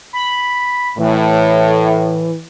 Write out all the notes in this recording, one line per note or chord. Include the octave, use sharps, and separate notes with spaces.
B5
A2 E3